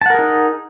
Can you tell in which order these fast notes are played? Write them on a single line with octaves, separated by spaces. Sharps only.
A5 F#5 A#4 G#4 D#4